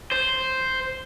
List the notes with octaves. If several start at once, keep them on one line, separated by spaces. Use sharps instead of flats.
C5